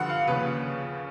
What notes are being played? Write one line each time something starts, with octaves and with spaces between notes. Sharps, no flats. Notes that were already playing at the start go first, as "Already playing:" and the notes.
Already playing: G2 D3 F3 F#5
F5
D#2 C#3 F3 B4